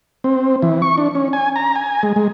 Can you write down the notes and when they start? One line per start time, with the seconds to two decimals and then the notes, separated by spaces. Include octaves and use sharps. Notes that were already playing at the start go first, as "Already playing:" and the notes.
0.24 C4
0.62 E3
0.82 C#6
0.98 D4
1.15 C#4
1.33 G#5
1.56 A#5
1.76 G#5
2.03 G#3
2.16 G#3